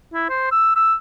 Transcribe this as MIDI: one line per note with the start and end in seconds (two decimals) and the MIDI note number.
0.14 0.27 64
0.29 0.49 72
0.52 0.75 88
0.76 0.94 88